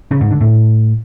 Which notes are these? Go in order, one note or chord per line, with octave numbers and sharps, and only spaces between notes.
C#3
G#2
D3
A2